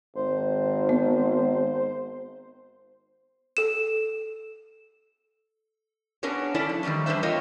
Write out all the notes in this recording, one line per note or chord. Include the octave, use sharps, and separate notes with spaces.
G#1 C5
B3
A4 E7
B3 C#4 D4 G#4 A#4 C#5
C#4 D4 E4 A4 D5
F3
D#3 E3 G3 A3 C#4
G3 D4 B4 C5 E5
A3 C4 F4 A#4 C#5 D#5